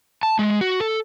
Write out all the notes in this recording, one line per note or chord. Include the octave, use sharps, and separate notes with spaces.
A5
G#3
F#4
A4